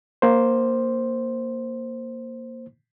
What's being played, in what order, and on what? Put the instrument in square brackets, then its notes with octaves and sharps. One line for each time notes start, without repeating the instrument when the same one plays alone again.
[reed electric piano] A#3 C5